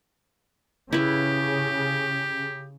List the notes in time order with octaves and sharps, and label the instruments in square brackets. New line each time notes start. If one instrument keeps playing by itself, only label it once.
[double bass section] C#3 [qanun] E4 B4 [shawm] G4